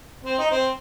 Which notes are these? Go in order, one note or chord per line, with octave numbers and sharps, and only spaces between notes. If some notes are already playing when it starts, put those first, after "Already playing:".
C4
D#4
C4